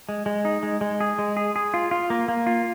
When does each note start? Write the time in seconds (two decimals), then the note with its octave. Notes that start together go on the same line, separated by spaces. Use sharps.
0.09 G#3
0.26 G#3
0.45 D#4
0.63 G#3
0.81 G#3
1.01 G#4
1.19 G#3
1.37 G#4
1.56 G#4
1.74 F4
1.91 F4
2.10 A#3
2.28 A#3
2.47 F4